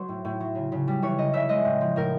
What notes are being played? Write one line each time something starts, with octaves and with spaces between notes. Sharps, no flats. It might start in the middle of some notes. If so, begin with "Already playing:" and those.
Already playing: F#3 C5
A2
A2
F#3
C#3
C#3
G3
E3 C#5
C#3 D#5
C#3 E5
G#3 D#5
A2
F3
A2 A#4